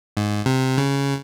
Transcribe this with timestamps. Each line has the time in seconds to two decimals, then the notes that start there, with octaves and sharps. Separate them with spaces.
0.17 G#2
0.46 C3
0.78 C#3